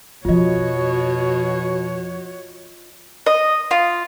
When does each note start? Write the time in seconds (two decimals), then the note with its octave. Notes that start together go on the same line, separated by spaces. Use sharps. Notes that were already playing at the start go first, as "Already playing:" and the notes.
0.25 F2 B2 F3 F4 F#4 C#5 D#5
3.26 D#5
3.71 F4